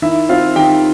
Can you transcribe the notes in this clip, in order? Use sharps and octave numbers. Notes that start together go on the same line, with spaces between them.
D#3 E4 E5
C4 F4 F5
D#3 G4 G5